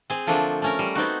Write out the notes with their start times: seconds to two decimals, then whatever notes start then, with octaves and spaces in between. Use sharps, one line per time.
0.10 C4 G#4
0.27 D3 F3 A3 A#3 C4 D4
0.62 A3 C#4 A#4
0.79 G3
0.95 B3 C4 D#4 F#4